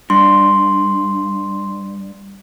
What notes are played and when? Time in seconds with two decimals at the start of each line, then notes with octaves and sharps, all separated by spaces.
0.10 G2 C6